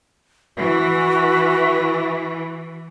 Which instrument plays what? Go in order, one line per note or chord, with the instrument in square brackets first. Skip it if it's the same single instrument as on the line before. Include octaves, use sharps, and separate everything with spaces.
[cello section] E3 [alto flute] F#4